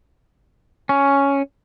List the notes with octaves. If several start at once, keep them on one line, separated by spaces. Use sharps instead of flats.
C#4